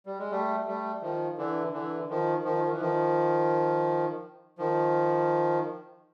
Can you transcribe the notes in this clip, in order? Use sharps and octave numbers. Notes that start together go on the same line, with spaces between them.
G3
G#3
G3 A3
G3 A3
D#3 F3
D3 E3
D3 E3
D#3 F3
D#3 F3
D#3
E3
D#3 F3
D#3 F3